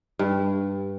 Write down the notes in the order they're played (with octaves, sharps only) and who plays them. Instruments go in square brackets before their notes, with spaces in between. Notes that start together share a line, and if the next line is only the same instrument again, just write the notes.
[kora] G2